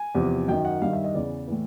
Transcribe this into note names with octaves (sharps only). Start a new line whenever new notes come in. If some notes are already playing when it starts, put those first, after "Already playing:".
Already playing: G#5
E2 C3 F3
F#2 D#3 G5
F#5
G2 D#3 F5
E5
D#5
E2 C#3 E3 D5
A2 E3